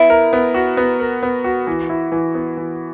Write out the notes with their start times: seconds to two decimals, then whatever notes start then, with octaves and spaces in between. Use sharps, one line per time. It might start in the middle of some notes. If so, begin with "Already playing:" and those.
Already playing: B3 E4
0.10 A#4
0.33 B3
0.54 F#4
0.77 B3
1.00 A#4
1.23 B3
1.44 F#4
1.67 E3
1.90 E4
2.12 E3
2.35 B3
2.57 E3